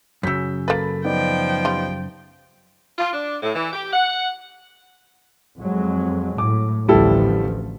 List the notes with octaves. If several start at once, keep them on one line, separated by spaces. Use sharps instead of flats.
F#2 C#3 E6 G6 B6
A#3 A4 B4 B5 A6
F3 B3 D#4 D5 G5
G3 F4
F4
D4
A2
E3
G4
F#5
F2 F#3 G#3
A2 D6
A1 D2 F3 G3 E4 A4